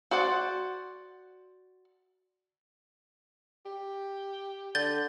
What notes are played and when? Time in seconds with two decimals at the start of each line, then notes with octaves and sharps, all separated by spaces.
0.11 F#4 C5 D5 F#5
3.66 G4
4.75 D3 G6 A6 G7